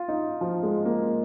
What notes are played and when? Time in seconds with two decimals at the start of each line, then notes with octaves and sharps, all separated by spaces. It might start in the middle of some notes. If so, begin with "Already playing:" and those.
Already playing: F4
0.08 D#4
0.41 F3
0.63 G#3
0.85 A#3